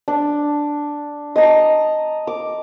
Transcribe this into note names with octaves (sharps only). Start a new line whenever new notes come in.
D4
D#5 A5 A#5
D6